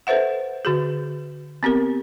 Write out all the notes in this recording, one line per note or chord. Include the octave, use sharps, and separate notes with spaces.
A4 B4 C5 E5 F#5
D3 F#4 G#4
B3 C4 G4 A#4